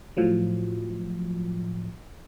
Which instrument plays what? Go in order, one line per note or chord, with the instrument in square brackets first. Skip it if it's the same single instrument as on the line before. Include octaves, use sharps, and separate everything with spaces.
[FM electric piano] A2 F3 F#3